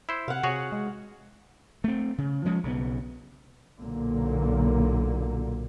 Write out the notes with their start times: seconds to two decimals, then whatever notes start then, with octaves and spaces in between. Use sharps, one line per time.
0.09 E4 C5
0.28 C3 F5 F#5
0.43 C3 F#4 G#4 C#5
0.72 G#3
1.84 A3 C4
2.18 C#3
2.45 F3 G#3 C#4
2.63 B1 C#3 F#3 B3
3.79 B1 A#2 D3 A#3